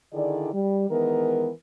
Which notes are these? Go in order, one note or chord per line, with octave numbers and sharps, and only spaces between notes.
D3 D#3 E4 G#4 D5
G3
D#3 E3 G#3 B3 A#4